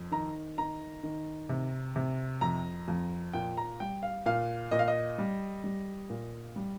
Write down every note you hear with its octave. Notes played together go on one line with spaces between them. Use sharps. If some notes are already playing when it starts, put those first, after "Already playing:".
Already playing: F2
D#3 A#5
D#3 A#5
D#3
C3
C3
F2 A#5
F2
A#2 G5
A#5
G3 G5
F5
A#2 F5
A#2 D#5
F5
D#5
G3
G3
A#2
G3